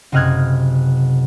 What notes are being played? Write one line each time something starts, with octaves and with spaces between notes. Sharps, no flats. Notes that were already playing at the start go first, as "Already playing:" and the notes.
F#1 C3 D#5 F6 F#6 G#6